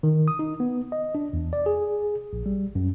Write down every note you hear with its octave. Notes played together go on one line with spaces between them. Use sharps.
D#3
D#6
D#4
B3
D#5
D4
E2
D5
G#4
A#1
G3
F#2